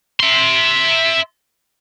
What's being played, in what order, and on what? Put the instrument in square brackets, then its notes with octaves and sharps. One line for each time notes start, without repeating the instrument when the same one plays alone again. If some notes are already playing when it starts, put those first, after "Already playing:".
[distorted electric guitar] E5 C6